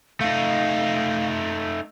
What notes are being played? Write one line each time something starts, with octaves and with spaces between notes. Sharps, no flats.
A3 D#4 F5